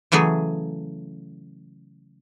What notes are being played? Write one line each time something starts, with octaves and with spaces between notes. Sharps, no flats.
C#3 E3 F#3 A3 G#4